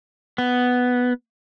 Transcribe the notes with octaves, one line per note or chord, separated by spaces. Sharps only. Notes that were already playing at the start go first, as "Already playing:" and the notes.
B3